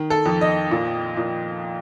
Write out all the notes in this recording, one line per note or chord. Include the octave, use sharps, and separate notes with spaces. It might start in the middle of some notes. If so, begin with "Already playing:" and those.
Already playing: D#3
A4
F2
D#5
A#2
A#2